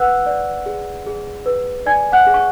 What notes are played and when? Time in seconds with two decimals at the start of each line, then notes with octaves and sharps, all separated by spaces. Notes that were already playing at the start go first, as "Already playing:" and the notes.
Already playing: B4 F#5 E6 F#6
0.26 D5
0.66 G#4
1.07 G#4
1.46 B4
1.86 D5 G#5 G#6
2.12 F#5 F#6
2.27 G#4
2.34 C#6